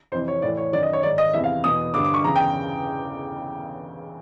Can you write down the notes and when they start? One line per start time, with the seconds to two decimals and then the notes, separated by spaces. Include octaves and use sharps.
0.12 F2 C3 E3 C5
0.28 C#5
0.42 A2 E3 D5
0.57 C#5
0.73 F#2 D#3 D5
0.83 D#5
0.93 C#5
1.03 G#2 D#3 D5
1.18 D#5
1.33 E2 C3 E3 E5
1.44 F5
1.64 E2 B2 D#6
1.94 G2 D3 D6
2.04 D6
2.14 C#6
2.24 E2 C#3 E3 A#5
2.36 G5